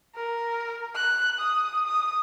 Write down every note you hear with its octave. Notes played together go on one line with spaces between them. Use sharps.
A#4
F#6
D#6
D#6